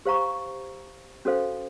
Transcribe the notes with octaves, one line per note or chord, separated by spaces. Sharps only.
G4 C5 F5 A#5 C#6
C#4 F#4 A4 C5 F5